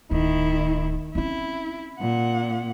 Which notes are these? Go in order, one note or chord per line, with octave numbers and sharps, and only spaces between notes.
D1 D#3 E4
C4 C#4 E4
A#2 F#5